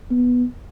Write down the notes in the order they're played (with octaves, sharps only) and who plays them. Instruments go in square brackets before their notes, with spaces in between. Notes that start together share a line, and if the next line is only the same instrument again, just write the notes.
[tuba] B3